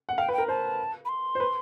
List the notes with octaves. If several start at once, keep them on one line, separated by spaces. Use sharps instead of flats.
F#5
F5 G5
B4
G5
A#4
C5 A5
B5
C6
C5
B4